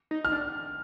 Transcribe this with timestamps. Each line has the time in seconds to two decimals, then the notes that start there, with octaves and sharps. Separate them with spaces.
0.11 D#4
0.25 F6
0.32 D4